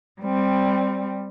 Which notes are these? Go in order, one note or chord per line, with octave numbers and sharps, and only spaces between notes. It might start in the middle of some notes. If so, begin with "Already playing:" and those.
G3 C4